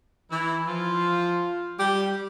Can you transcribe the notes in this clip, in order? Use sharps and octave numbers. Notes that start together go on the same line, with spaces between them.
E3 E4
F3 F4
G3 G4